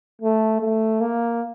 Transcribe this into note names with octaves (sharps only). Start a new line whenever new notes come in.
A3
A3
A#3